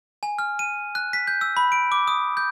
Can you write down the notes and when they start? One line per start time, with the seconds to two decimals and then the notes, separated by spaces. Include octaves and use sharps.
0.23 G#5
0.39 F6
0.59 D#7
0.95 F#6
1.13 B6
1.27 G6
1.41 E6
1.57 B5
1.72 D7
1.92 D6
2.08 D#6
2.37 G6